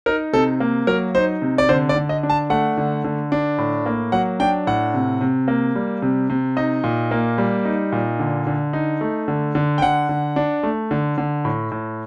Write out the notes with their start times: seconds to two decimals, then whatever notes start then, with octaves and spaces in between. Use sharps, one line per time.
0.06 D#4 A#4
0.33 C3 A4
0.60 A#3
0.87 F#3 A#4
1.15 D#4 C5
1.42 C3
1.58 D5
1.69 D3 C5
1.89 D5
1.96 D3
2.09 D#5
2.23 D4
2.30 A5
2.50 A3 F#5
2.78 D3
3.04 D3
3.32 D4
3.58 A2
3.86 A#3
4.12 F#3 F#5
4.40 D4 G5
4.67 A2 F#5
4.94 C3
5.21 C3
5.48 A#3
5.75 G3
6.02 C3
6.30 C3
6.57 D#4 D#5
6.84 A#2
7.11 A#3
7.38 G3
7.65 D#4
7.92 A#2
8.19 D3
8.47 D3
8.73 D#4
9.01 A3
9.28 D3
9.55 D3
9.78 G5
9.82 D3 F#5
10.09 D3
10.36 D4
10.63 A3
10.91 D3
11.18 D3
11.45 A2
11.72 A2